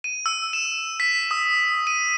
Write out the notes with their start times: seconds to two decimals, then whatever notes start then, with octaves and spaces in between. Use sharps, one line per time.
0.04 D#7
0.26 E6
0.53 E7
1.00 B6
1.31 D#6
1.87 D#7